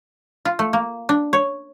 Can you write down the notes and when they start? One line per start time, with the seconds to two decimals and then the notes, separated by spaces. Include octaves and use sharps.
0.45 F4
0.59 A3
0.73 A#3
1.09 D4
1.33 C#5